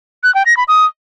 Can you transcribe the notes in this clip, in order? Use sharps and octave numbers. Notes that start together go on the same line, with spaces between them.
F#6
G5
A#6
B5
D#6